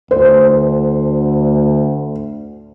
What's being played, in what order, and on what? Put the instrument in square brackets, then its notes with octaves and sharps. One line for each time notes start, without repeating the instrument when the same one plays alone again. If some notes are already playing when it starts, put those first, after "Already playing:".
[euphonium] D2 [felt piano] C5